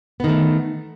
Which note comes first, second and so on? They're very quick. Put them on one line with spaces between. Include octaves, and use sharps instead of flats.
B3 D#3 A3